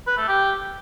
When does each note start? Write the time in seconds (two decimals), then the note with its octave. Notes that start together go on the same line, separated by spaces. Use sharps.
0.07 B4
0.18 A3
0.28 G4